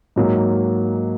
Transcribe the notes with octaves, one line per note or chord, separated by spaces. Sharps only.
G#2 F#3 A#3